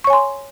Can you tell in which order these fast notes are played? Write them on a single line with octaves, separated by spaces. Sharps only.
C#6 C#5 G#5 C6